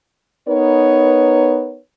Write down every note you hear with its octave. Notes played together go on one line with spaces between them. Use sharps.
B3 D#4 A#4 B4 C#5